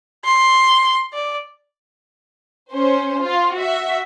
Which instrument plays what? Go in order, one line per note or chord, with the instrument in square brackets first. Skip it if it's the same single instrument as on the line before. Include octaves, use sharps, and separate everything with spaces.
[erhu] C6
D5
[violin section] C#4 C5
F4
F#4 E5